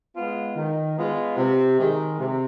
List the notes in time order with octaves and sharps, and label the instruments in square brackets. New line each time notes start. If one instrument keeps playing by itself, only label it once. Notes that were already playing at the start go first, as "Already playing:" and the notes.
[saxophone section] G#3 B3 F4
D#3
G#3 B3 F4
C3
D#3 G#3
C3